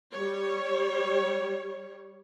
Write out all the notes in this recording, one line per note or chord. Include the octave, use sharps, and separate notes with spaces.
G3 C#5